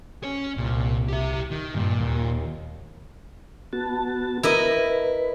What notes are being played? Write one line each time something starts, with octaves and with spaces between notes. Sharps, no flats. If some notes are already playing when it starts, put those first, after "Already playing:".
C#4 C#5
C2 A#2
G4 E5
D#3
G2 A#2
D#2
B3 F#4 A5
E4 A#4 B4 D#5